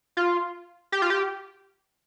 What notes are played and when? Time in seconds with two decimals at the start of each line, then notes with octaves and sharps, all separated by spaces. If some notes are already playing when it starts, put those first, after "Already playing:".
0.17 F4
0.92 G4
1.02 F4
1.10 G4